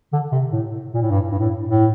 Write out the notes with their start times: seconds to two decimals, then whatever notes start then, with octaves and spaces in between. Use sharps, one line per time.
0.13 D3
0.32 C3
0.52 A2
0.94 A#2
1.02 A2
1.10 G2
1.32 G2
1.39 A2
1.68 A2